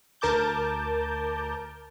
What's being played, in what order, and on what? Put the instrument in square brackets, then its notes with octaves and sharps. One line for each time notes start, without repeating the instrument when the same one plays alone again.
[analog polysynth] D2 A#4 A5 D6 G6